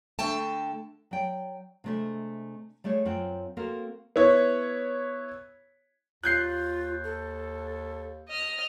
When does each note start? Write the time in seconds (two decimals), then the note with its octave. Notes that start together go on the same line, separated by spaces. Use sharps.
0.19 D3 A3 G5 A5
1.11 F#3 D5 G5
1.84 C3 G#3 A3 D4 E5
2.84 G3 A3 G#4 C#5
3.05 F#2 C4 F4 F#5 G5
3.57 A#3 C4 F#4 A4 A#4 C5
4.16 B3 E4 C#5
6.24 D#2 F4 F#6 G6 C7
7.04 A4
8.28 D#5 F6